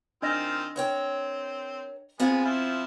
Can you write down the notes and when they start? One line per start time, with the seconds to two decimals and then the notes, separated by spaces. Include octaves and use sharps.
0.22 D#3 C4 D4 F4 D#5 A#6
0.76 C4 A#4 C#5 G5
2.20 G#3 B3 C4 F4 G#5
2.45 F3 E4